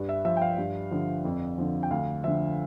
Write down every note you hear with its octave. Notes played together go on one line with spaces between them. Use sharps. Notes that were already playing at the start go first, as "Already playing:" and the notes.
Already playing: G2
E5
F3 E5
G5
F5
G2
D3 F3
F2
D3 F3
G5
D2 F5
D3 F3 E5